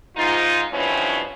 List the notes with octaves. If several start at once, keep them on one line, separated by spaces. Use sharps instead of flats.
G#2 D#4 F4
G2 B2 F3 C4 C#4 E4